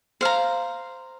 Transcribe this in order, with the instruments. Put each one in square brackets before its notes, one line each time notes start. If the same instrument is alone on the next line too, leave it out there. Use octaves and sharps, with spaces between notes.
[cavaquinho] C5 F5 A#5